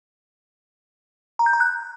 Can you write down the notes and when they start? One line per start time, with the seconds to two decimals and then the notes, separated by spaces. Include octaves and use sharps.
1.39 A#5
1.46 G6
1.53 A#5
1.60 F#6